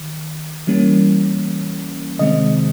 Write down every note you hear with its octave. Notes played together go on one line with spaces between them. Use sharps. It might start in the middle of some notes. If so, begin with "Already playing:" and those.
Already playing: D#3
E3 G3 A#3 C#4
C3 D#3 G#3 C4 D#5